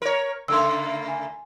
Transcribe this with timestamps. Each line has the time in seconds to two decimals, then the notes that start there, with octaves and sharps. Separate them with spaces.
0.02 A#4 C#5
0.48 C#3 A3 A#3 C6 E6
1.08 G#5